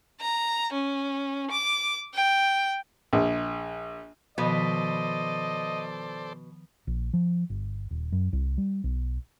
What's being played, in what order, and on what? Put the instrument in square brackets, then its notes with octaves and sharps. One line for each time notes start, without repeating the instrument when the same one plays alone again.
[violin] A#5
C#4
D6
G5
[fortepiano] A#1
[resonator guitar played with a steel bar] B2 [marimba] D#3 F3 [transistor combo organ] A4 C5 D5 [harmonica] D#5
[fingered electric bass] A#1
F3
G1
D#1
F#2
C2
G3
B1